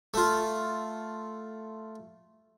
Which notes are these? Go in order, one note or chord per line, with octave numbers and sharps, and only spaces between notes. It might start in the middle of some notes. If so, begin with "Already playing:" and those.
A3 F4